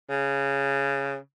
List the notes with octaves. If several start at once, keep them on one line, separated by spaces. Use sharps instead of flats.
C#3